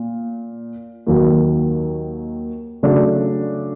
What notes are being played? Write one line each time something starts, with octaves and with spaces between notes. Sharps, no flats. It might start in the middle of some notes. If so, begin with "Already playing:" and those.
Already playing: A#2
D#2 D#3 F#3
C#3 F#3 A3 D4